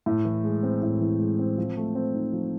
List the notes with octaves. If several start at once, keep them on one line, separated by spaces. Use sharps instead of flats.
A2
E3
G#3
C4
A2
E3
G#3
C4
F3
A3
C4
D#4
F3